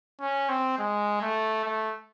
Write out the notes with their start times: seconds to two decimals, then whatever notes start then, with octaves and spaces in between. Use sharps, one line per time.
0.21 C#4
0.49 C4
0.78 G#3
1.22 A3
1.65 A3